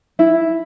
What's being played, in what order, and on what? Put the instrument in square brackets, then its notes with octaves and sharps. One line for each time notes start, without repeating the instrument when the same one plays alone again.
[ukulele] E4